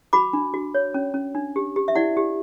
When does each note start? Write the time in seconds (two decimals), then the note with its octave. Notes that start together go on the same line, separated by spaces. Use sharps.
0.13 F#4 B5 D6
0.33 D4
0.54 F#4
0.75 C#5
0.94 C#4
1.14 C#4
1.35 D4
1.56 G4
1.76 G4
1.88 E5
1.95 E4 D5 F#5
2.17 G4